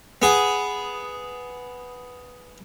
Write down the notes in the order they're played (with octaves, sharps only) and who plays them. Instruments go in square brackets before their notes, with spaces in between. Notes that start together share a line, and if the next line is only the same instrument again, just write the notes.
[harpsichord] B3 G#4